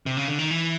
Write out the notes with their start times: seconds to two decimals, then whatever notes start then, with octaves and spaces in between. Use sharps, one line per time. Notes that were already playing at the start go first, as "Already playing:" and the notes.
0.06 C3
0.17 C#3
0.28 D3
0.39 D#3
0.50 E3